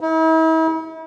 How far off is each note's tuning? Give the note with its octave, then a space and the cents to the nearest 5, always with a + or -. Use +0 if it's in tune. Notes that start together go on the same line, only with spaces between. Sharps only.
E4 -45